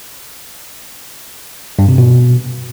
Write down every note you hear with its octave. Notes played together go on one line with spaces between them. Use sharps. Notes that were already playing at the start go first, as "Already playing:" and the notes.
G2
C3
B2